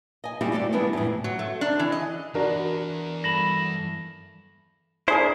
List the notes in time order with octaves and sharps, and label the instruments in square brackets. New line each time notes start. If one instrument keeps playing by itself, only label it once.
[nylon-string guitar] D#5 G#5
G3 C4 E4 F#4 G4
D3 A3 C5 D5
E3 G3 G#3 B3 D4 E4
F2 A2
[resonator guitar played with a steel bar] F#3
A3
D4
E3
D#5
[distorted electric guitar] E2 [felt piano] D4 F#4 A#4
[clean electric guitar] G2 A4 B5 [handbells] A#6
[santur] D4 G#4 A#4 [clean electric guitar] E4 C5